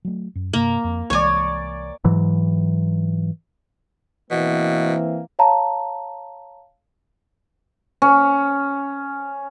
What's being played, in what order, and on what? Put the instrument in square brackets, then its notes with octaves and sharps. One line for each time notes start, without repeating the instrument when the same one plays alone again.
[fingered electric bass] F#3 A3
F#2
[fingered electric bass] G2 C3 [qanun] A#3
[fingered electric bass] F2
[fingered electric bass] C2 E3 G#3 [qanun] C#5 G#5 [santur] D5 C#6
[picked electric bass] G#2 E3 F#3
[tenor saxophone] B2 [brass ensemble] E3 A#3 C4
[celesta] C#5 F5 A5 A#5
[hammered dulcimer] C#4